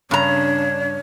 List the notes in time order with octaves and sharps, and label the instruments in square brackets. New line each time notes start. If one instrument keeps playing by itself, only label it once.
[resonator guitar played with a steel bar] G2 A#5 [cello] C#3 D4 [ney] C#5